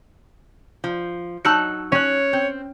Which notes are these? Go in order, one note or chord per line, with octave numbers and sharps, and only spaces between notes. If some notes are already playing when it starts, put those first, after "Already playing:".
F3
F#3 D#4 A5 E6 F#6 C#7
C#4 C#5 F#6
C4